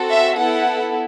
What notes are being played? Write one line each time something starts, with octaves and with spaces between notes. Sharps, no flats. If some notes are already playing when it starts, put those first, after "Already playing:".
Already playing: C4 F#4 A4
E5
B3 E4 A4 F#5